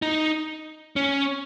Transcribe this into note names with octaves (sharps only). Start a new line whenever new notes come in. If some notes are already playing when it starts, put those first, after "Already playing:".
D#4
C#4